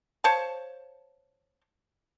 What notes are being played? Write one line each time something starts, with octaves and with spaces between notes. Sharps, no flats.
C5 C#5 F5 A5